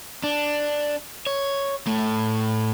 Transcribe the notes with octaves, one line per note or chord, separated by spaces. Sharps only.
D4
C#5
A2 A3